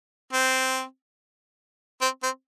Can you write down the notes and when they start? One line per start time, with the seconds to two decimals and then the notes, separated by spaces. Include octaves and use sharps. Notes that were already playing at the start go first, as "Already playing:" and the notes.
0.33 C4
2.01 C4
2.23 C4